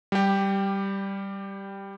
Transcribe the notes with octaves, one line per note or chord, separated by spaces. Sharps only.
G3 G4